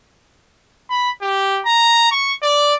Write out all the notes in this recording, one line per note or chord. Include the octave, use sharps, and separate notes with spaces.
B5
G4
A#5
C#6
D5